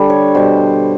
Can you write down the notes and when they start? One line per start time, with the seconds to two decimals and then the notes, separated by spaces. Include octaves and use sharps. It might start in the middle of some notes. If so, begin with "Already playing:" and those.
Already playing: D3 G3
0.10 C#5
0.35 B2 G3 C5